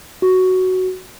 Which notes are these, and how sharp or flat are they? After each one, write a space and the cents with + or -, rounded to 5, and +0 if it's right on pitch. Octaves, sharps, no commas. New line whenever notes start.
F#4 +5